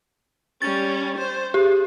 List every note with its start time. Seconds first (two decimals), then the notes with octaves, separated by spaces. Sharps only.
0.62 G3 C#4 A6
1.18 C5
1.54 G4 G#4